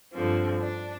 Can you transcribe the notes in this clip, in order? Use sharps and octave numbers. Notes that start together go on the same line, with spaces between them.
G2 D3 F3 C4
D4